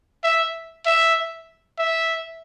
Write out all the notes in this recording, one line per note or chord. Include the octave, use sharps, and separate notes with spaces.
E5
E5
E5